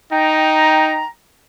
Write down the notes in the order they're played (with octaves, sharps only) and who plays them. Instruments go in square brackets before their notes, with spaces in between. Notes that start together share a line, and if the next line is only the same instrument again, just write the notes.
[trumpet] D#4 [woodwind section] G5 A#5